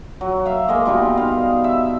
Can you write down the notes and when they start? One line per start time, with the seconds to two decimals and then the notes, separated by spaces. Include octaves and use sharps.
0.21 F#3
0.46 E5 F5
0.68 G#3 A#3 D#5
0.86 B2 G3 D#4 F4
1.17 F5
1.64 E5